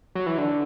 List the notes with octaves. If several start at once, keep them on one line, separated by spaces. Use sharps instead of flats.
F#3
E3
D3